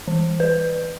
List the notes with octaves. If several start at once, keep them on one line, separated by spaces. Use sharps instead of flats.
E3
B4